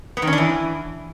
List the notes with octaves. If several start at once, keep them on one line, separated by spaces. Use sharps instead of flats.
B3
D#3
C#4
D4
E3